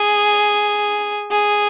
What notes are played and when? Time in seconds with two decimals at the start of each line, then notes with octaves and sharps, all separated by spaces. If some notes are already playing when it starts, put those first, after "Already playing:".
Already playing: G#4
1.32 G#4